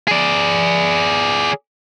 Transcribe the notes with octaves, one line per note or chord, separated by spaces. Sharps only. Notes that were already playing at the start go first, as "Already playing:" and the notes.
G#4 D5